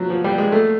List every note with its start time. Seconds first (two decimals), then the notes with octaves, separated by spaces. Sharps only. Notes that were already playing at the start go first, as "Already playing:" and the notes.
Already playing: F3 F#3
0.10 F3
0.24 G3
0.38 G#3
0.52 A3